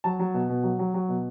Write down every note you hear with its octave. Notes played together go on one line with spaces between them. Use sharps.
F#3 A5
F#3
B2
B2
F#3
F#3
F#3
B2